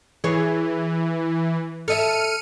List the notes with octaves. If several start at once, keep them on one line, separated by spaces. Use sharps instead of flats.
E3 G#4 C#5
A4 D#5 E5 F6 C#7 D#7